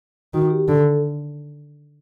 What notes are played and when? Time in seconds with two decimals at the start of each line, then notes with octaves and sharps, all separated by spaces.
0.34 D#3 F#4
0.50 G4
0.68 D3 A4